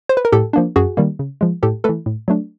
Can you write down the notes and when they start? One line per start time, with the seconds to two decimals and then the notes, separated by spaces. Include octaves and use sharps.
0.09 C5
0.17 B4
0.25 A#4
0.32 A2 G4 A4
0.53 F3 A#3 D4
0.76 F#2 F#4 G#4
0.97 D#3 G3 A#3
1.19 C#3
1.41 F3 G#3
1.63 A2 G4 A4
1.84 A3 A4 B4
1.89 E3
2.06 A2
2.28 F#3 A3 D4